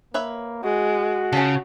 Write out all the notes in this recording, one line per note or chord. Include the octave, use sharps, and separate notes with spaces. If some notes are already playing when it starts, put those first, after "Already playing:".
A#3 B4 C#5 E5
G#3 F#4
C#3 C#4 F4 A4